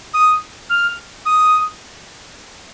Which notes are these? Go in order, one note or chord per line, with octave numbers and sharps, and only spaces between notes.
D#6
F6
D#6